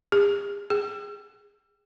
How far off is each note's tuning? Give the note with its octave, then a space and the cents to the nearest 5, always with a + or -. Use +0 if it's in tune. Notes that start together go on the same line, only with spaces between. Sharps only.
G#4 -45
G#4 -20